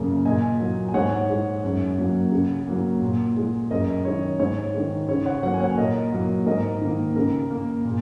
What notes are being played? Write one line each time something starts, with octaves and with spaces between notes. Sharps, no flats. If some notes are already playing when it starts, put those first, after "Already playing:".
Already playing: F#2 C#3 A#3
A#2 D#5 G#5
F#3 A#3
G#5
G#2 C#5 F#5
G#3
F#2
F#3 A#3
C#3
F#3 A#3
A#2
G#3
F#2 A#4 D#5
D#3 G#3 C#5
G#2 C#5
D#3 G#3
C#3 C#5
C#5 F#5
F#3 A#3 C#5 F#5
G#5
C#5 F#5
A#2 A#4 D#5
F#3 A#3
G#2 A#4 D#5
D#3 A#3
C#3 A#4
A#3
A#2